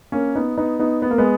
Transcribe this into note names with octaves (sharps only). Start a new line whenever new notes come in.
A#3 C#4
B3 D#4
B3 D#4
B3 D#4
B3
A#3
G#3 B3